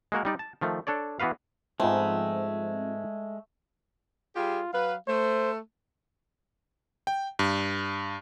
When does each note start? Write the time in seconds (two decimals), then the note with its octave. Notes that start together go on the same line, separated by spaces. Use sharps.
0.12 G#3 A#3 F#4 A#4
0.25 G3 D#4 D5
0.39 A5
0.61 D#3 F3 A3
0.87 D4 A4 C#5 D5
1.20 E3 B3 F#4 B4 F5
1.80 G#2 F3 G#3 A3 B3 C4
4.36 G3 F4 G4 G#4
4.73 F#3 B4 F5
5.07 A3 C5
7.07 G5
7.39 G2